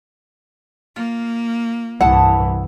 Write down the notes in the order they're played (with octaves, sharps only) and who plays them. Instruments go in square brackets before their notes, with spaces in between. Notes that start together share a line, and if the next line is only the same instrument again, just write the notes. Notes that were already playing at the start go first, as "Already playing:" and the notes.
[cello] A#3 [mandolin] F4
[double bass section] C2 G2 E3 [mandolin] E4 A5 D#6 [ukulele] F#5